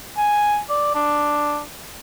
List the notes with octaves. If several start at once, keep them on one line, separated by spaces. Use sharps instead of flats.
G#5
D5
D4